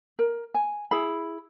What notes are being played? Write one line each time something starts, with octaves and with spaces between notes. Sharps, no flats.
A#4
G#5
E4 G#4 B5